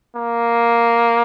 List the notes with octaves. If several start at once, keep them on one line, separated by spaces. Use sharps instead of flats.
A#3